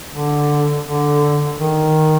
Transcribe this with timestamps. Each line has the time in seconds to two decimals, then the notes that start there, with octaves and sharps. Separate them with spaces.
0.11 D3
0.84 D3
1.58 D#3